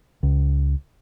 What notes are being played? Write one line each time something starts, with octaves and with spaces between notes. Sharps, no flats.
C#2